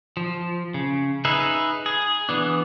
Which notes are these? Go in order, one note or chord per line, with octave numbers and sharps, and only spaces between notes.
F3
C#3
D#4 G#4 B4 E5
G#4
E3 B3 D4